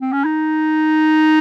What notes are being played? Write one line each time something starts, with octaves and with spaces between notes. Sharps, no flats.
C4
C#4
D#4